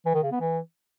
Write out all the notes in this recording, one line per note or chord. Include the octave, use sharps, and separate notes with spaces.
E3
D#3
C#3
B3
E3